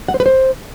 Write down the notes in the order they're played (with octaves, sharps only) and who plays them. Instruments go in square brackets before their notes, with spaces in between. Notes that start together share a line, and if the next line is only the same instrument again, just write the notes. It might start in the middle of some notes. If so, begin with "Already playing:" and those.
[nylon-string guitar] F#5
C5
B4
C5